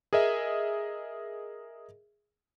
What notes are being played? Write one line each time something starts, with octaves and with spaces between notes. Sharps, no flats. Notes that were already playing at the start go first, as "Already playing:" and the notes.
G#4 A#4 D#5 E5